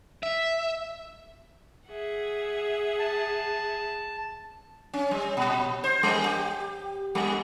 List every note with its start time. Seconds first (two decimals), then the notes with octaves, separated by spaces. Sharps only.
0.23 E5
1.87 G#4 E5 F#5
2.99 A5
4.94 C#4
5.11 G3
5.37 A#2
5.84 C5
6.03 G3
6.26 G4
7.15 G3